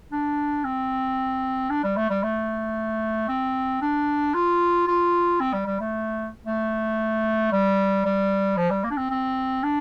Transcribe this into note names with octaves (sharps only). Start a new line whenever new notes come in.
D4
C4
D4
G3
A3
G3
A3
C4
D4
F4
F4
C4
G3
G3
A3
A3
G3
G3
F3
G3
A#3
D4
C4
C4
D4